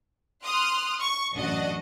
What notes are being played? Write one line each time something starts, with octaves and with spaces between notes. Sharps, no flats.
C6 D#6 F6 F#6
C#6
A1 F#2 D4 F#4 D#5 F#5